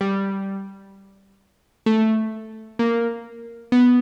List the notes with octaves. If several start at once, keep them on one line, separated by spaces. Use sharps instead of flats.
G3
A3
A#3
B3